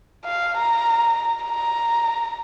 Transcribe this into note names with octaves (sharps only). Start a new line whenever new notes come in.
F5
A#5
A#5